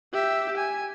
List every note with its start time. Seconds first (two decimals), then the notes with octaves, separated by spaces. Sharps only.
0.13 G4 E5
0.57 G#5